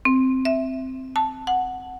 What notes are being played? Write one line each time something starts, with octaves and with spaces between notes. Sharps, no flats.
C4
E5
A5
F#5